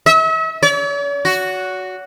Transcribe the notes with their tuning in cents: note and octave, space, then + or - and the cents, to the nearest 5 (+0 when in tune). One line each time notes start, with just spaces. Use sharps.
E5 -40
C#5 +45
F#4 +0